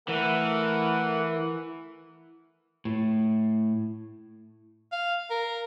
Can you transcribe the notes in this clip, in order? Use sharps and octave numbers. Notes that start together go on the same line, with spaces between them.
E3 A3 A#4 F#5
A2
F5
A#4